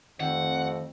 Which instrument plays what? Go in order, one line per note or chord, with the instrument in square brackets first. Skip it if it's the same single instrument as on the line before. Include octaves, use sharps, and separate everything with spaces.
[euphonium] F2 [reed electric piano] D#3 G5 [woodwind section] G3 A3 C4 [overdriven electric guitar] F#5